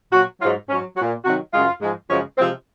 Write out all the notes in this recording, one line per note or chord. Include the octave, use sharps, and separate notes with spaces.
A#2 F#3 F#4
G#2 F#3 F4
G#2 F#3 C#4
F#3 F#4
A#2
C3 D#3 F#3 F#4
F#2 C#3 G#3 F4
G#2 F3 G#3
F#2 C#3 F3 G#3 C#4
C3 F3 G#3 C4